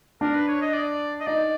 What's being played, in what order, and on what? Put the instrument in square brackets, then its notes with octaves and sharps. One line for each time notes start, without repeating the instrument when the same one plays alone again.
[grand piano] D4 [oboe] A#4
[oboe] B4
C#5
D#5
D5
D#5
[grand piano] D#4 [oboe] D5